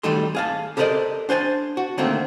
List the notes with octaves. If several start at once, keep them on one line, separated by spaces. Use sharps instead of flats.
D#3 G3 A3 D#4 A4 C6
G#4 F5 A5
G4 A4 A#4 C5 D5 D#5
D4 C5 G#5 A5
F#4
D3 D#3 A3 A#3 C4